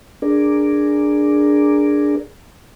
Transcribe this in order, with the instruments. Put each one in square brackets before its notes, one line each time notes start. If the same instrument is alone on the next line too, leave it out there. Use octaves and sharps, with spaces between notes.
[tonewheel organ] D4 G#4 A#4 D5